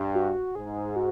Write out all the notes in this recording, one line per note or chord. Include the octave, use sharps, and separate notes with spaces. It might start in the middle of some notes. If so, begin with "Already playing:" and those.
Already playing: G2
F#4
G#2 G#4
F#4